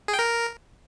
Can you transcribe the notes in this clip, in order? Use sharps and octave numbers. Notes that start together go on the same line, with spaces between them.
G#4
G5
A#4